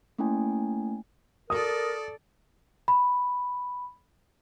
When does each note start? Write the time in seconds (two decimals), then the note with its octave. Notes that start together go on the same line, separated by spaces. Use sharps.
0.18 A3 A#3 C#4 E4 G5 G#5
1.50 A4 A#4 D5 D#6
2.88 B5